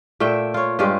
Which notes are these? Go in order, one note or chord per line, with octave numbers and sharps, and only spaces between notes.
A#2 A3 E5 G5
F4 C#5
G2 G#3 F4 G4